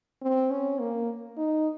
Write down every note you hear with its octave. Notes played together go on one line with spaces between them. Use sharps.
C4
C#4
A#3
D#4